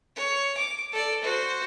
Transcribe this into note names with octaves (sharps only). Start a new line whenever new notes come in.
C#5
D6
A4 D5
F#4 C5